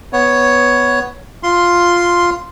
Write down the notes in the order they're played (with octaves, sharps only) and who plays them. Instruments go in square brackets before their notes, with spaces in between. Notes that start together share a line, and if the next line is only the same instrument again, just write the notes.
[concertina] B3 C#5
F4 C6